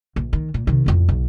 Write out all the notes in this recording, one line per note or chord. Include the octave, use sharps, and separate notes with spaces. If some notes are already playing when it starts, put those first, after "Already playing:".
A#1
D#3
A#2
C3 D#3
A1 F2
B1